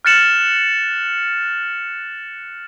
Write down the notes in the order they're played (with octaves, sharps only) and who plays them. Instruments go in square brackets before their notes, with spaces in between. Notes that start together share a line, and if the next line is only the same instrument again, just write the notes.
[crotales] F6 F#6 A6 C#7 E7 F#7